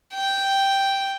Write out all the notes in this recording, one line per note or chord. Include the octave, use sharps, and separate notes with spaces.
G5